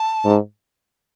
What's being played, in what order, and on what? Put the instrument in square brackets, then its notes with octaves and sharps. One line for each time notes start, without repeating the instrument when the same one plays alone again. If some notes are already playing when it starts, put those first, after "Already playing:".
Already playing: [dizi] A5
[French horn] G#2